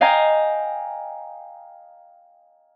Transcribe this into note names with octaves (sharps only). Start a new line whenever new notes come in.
D#5 F5 G5 G#5 A#5